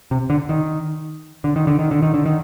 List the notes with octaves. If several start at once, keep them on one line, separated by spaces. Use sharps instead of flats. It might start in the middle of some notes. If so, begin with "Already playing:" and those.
C3
D3
D#3
D3
D#3
D3
D#3
D3
D#3
D3
D#3